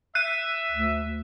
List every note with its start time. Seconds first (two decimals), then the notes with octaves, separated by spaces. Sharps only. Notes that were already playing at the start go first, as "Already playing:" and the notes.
0.15 E5 F#6 D#7
0.71 D2